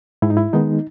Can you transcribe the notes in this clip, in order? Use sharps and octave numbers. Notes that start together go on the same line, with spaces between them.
G#2 E4
D#4
E4
D#3 G#3 B3 D#4